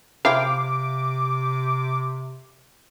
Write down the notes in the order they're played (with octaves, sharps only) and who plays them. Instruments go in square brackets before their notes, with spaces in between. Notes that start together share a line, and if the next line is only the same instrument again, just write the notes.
[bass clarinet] C3 [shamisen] F3 E4 G4 [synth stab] F5 [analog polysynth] D6